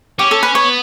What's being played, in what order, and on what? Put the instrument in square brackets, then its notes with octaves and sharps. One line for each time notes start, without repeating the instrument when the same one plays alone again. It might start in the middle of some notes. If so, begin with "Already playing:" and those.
[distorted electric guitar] C#4 [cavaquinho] G4
[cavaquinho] A4
B4
[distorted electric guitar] B3 [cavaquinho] C#5